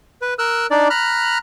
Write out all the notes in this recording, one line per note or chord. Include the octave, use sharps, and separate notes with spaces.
B4
A#4 E6 F#6
D4 D#4 D5
A#5 B5 F6 F#6